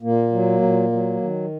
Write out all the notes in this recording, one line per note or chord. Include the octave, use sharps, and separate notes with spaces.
A#2 A#3
F#3
A#2
F#3
D#3